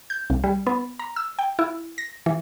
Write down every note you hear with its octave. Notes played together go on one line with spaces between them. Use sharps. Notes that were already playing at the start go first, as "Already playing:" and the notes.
G6
C2
G3
B3
A#5
E6
G5
E4
A#6
E3